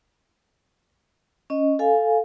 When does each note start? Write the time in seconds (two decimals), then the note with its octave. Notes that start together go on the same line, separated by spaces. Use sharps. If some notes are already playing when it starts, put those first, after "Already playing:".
1.50 C#4 D#5
1.79 A4 F5 G#5